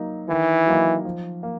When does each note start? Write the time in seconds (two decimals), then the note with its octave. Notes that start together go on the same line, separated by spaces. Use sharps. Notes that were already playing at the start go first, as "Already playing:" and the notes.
Already playing: F#3 A#3 D#4
0.29 D#3 E3
0.67 F#3 A#3 D#4
1.05 F3
1.43 A#3